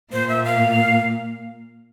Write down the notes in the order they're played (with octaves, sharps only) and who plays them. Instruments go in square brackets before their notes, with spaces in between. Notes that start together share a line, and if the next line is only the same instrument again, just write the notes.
[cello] A#2 [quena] C5
[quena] E5
F5